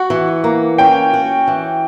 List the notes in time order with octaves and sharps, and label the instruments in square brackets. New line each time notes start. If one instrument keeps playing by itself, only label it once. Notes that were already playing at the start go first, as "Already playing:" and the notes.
Already playing: [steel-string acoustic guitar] F#4 [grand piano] F#5
[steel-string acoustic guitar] E3
A#3
[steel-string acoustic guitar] C#4 [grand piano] G5
[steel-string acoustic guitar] F#4
E3